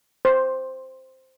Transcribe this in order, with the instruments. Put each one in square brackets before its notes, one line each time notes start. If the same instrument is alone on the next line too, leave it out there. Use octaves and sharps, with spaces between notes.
[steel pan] C5